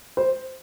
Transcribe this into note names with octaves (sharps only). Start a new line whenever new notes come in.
C5